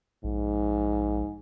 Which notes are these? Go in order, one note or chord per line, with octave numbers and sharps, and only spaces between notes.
A#1 G#2